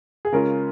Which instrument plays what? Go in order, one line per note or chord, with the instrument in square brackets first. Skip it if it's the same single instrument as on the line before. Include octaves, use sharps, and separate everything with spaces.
[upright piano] G#4
[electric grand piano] C#3 G#3 C#4 F4 [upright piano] A#4